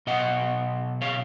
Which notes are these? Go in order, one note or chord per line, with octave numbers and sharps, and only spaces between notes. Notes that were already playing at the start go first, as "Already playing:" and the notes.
B2 F#3 D#5 F#5
C#5 F5